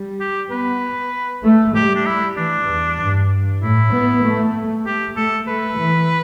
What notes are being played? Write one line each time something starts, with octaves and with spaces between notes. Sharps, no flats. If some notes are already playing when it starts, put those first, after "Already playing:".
Already playing: G3
G4
B3 B4
A3
G3 G4
D4
E4
E3 D4
E2
G2
A2 E4
B3
A3
A3 G4
A3 A4
A3 B4
E3